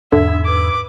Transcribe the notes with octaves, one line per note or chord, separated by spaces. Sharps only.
E2 G#2 D3 E5
B4 D6